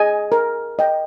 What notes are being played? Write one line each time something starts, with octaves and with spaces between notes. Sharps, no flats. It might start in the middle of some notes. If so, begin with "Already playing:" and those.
Already playing: G#4 D#5 G#5
A#4
D#5 G5